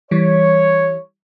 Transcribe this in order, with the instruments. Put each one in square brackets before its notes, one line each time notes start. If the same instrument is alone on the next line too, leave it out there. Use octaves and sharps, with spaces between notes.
[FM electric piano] E3 G3 [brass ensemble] C#5